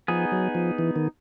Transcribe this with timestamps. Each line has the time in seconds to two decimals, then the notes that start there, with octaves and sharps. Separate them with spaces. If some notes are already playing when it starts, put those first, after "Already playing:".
0.08 F3 B3 D#4 G#4
0.32 F#3
0.55 F3
0.79 E3
0.96 D#3